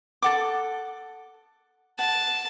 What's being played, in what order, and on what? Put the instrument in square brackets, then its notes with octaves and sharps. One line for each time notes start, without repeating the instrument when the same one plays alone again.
[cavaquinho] A4 F#5 D6
[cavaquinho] F#5 [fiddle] A5